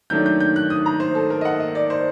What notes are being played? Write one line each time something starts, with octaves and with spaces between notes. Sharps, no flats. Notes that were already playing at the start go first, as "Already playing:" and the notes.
D#3 F#3 A3 D4 G6
G6
G6
F#6
D#6
A#5
C5
A4
A#4
D#5
F#5
D#5
D5
C5